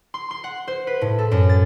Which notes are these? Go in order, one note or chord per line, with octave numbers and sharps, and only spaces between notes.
C6
C6
F#5
C5
B4
A2
A4
F#2
A6